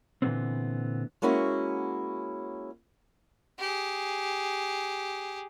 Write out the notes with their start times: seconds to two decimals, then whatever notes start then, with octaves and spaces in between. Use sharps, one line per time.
0.22 A#2 D3 E3 G3 B3 C4
1.22 G#3 A#3 C#4 E4 F#4
3.59 G4 G#4